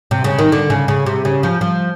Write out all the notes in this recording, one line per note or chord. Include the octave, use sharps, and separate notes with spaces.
C3
C#3
D#3
D3
C#3
C#3
C3
C#3
F3
F3